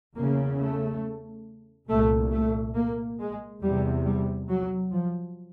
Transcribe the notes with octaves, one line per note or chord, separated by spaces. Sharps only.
E2 C#3 A#3
A3
C2 A#2 A3
A3
A#3
G#3
E2 C3 G3
G3
F#3
F3